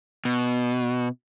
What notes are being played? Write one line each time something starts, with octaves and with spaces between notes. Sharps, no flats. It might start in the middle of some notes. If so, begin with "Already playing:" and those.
B2